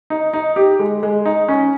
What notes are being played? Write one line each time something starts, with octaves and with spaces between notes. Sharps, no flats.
D#4
D#4
G4
G#3
G#3
D#4
C#4